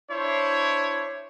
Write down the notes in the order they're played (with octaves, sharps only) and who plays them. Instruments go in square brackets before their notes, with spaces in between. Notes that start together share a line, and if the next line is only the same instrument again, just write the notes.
[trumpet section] D4 E4 C5 C#5